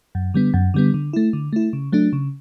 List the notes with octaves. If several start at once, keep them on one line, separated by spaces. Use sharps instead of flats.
F#2
D3 G3 B3
F#2
D3 G3 B3
D3
A3 E4
D3
A3 E4
C#3
F#3 A3 D4
C#3